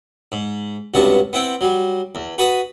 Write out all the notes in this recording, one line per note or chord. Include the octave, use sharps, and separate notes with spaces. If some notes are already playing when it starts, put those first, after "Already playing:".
G#2
C#2 G2 C3 B3 F#4 A5
B3 C4 E4 F#5 G5
F#3 G3
E2
F#4 B4 A5 B5 D#6